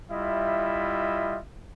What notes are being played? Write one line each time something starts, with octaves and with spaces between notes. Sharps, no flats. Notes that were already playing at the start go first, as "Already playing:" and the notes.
G3 E4 F4 D#5 E5